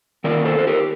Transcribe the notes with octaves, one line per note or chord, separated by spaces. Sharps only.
D#3 A#3 F4 A#4 D5
A4 C5
C5
G4 A#4